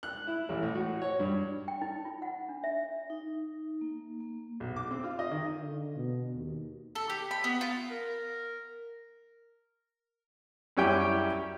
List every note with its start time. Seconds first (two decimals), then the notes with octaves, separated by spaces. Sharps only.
0.03 F#6
0.27 E4
0.49 A1
0.62 A2
0.75 F#4
1.02 C#5
1.20 G2
1.68 G5
1.82 D#4
2.05 F4
2.22 F#5
2.49 D4
2.64 E5
3.10 D#4
3.81 A#3
4.20 A#3
4.60 B1
4.76 D6
4.91 C4
5.04 F4
5.19 D#5
5.31 D#3
5.60 D3
5.96 B2
6.35 D#2
6.95 A4
7.10 G4
7.31 B5
7.44 B3
7.61 F4
7.90 A#4
10.77 F#2 G3 C#4 E4 G4 G5